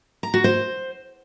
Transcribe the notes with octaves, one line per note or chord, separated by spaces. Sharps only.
A#5
F#4
C5